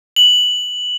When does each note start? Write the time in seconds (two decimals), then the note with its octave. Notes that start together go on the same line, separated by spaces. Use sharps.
0.16 F#7